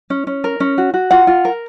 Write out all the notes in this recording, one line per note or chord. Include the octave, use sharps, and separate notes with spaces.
C#4
C#4
A#4
C#4
F#4
F#4
F4 F#5
F4
A#4